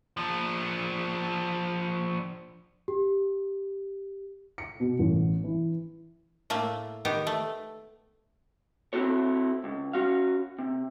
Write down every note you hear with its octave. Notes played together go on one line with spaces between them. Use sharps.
F3 D4
G4
C#7
B2
A1
E3
A2 A3 A#3
D#3 B3 G4
A3
C4 E4 F#4 A4 C#5
C#2
C#4 F#4 F5
C3